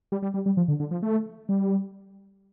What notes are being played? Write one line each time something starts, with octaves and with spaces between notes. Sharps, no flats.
G3
G3
G3
G3
F3
D3
D3
F3
A3
G3